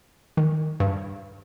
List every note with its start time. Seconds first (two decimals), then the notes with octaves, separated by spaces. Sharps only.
0.37 D#3
0.80 G2